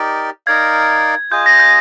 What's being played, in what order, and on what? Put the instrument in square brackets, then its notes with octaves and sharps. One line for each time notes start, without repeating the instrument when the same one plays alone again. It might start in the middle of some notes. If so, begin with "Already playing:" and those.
Already playing: [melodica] D#4 G4 A#4 D5
[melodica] D#4 A#4 D5 F5 [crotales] G#6
[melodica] F4 G#4 D#5 [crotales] G6
[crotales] A#6
G6